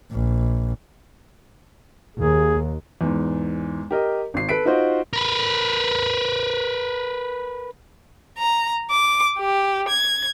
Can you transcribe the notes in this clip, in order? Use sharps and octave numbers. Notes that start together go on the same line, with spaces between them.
A#1
D#2 G#4
E2 G#2
G4 A#4 D#5
G#1 C7
A4 B4 B6 D7
D#4 F4 F#4 C5 D#5
A#4 B4
A#5
D6
G4
G#6